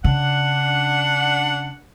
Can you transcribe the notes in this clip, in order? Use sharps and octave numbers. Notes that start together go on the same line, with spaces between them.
C#3 D4 F#5